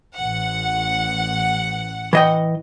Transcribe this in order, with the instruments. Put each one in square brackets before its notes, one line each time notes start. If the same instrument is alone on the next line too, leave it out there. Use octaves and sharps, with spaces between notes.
[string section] A1 F#5
[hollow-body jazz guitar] E3 D#5 G5